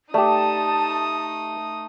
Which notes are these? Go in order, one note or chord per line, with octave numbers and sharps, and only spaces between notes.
A3 D#4 G4 D5 A5 D#6